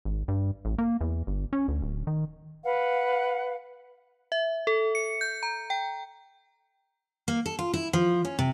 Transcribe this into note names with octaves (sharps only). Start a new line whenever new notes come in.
G#1
G2
A1
A#3
E2
G1
C#4
D2
D1
D#3
B4 F5 F#5
E5
A4
C#7
G6
A#5
G5
A#3
A4
F4
E4
F3
C#4
C3